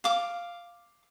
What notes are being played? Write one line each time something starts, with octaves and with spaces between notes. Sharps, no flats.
F5 D6